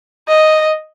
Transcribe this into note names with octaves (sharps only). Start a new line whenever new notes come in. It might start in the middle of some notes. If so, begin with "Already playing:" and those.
D#5